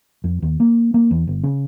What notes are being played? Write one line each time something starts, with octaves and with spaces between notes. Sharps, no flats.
F2
D#2
A#3
A#3
E2
G1
C#3